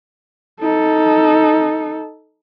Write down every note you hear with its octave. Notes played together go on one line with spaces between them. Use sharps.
D#4 A4